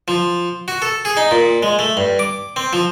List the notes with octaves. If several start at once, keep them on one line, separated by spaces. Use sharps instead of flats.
F3
F#4
A4
G#4
D#4
A#2
G#3
A3
G2
D6
C4
F3